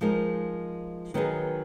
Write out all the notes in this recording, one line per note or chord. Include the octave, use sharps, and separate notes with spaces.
F3 G#3 D#4 A#4
D#3 F#3 B3 D#4 G#4